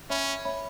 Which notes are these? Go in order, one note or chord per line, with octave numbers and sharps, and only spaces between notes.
C#4 C#5 E5 B5
C#5 E5 B5